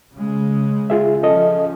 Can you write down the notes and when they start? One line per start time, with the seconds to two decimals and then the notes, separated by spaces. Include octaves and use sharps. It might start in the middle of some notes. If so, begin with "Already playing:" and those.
0.13 C#3 G#3
0.90 F4 G#4 E5
1.23 F3 C#4 A4 D#5